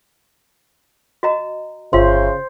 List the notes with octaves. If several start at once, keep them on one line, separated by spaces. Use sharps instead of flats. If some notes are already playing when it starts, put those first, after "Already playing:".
F#4 D#5 A#5
G1 C#3 F4 C5 E5 F5 C6